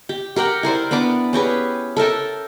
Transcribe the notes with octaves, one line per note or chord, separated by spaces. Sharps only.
G4
G4 A#4 F#5 G5
E4 A#4 C5 D5
B3 D4 B4 D6
C#4 G4 G#4 B4
A4 A#4 E5 G5